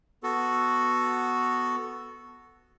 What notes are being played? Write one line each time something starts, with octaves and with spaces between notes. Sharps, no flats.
B3 F#4 A4